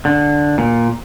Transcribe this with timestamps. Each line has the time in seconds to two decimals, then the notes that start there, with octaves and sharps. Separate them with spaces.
0.05 D3
0.58 A#2